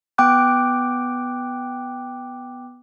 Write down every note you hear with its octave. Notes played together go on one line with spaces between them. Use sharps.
B3 G5 D6 F#6